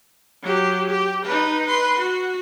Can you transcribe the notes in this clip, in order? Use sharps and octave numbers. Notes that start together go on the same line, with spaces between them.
F#3 G4
G4
D#4 B4
B4 C6
F#4